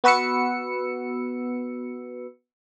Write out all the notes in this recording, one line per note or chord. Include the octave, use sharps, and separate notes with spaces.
B3 F#4 B4 E6 C#7